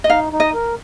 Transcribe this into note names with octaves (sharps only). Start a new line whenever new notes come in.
D#5
D#4 F5
D#4
D#5
A#4